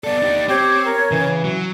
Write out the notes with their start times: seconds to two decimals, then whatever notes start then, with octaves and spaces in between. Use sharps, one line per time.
0.04 B3 A4 D5
0.23 D#4 G4
0.49 C4 G4 C#5
0.86 A#4
1.11 C#3 E3
1.44 F#3